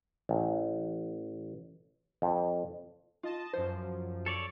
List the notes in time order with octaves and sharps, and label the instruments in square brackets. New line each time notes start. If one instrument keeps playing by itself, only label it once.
[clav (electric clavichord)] A1
F2
[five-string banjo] F4 [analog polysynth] D#5 A5
[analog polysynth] F#2 F3 [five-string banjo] C5
[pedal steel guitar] A4 C#5 D5